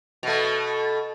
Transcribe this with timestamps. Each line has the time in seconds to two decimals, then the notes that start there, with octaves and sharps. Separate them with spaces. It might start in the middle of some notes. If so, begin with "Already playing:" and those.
0.23 B2 A3